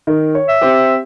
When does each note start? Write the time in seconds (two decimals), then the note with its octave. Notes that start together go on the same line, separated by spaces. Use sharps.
0.07 D#3
0.35 C#5
0.49 E5
0.61 C4 G4